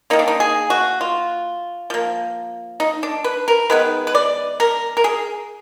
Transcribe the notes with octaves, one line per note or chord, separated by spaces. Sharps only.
D#3 A#3 D#4
D4
D#4
G#4
F#4
F4
F3 A#3
D#4
D4
B4
A#4
D#3 G#3 B3 B4
B4
D5
A#4
A#4
G#4